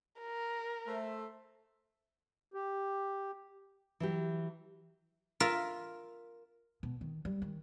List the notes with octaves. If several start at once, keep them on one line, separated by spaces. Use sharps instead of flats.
A#4
A3 C5 E5
G4
E3 F#3 G4
F4 A#4 E5
B2
D#3
G3
D#3